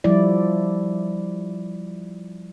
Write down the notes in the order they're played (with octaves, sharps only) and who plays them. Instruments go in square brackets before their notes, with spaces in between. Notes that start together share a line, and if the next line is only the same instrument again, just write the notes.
[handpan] F3 G3 E4 D5